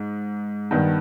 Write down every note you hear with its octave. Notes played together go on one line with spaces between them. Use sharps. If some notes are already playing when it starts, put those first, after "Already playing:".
Already playing: G#2
G2 D#3 B3